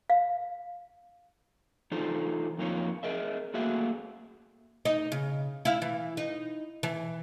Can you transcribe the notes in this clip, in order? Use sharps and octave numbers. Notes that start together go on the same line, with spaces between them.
F5
E3 D#4 F4 A4 C5
F2 A#3 D#4 F4 C#5
G#4 A#4 D#5 E5
A3 A#3 F#4 G#4 E5 F5
D#4 D#5
C#3
E4 F5
E3
D#4
E3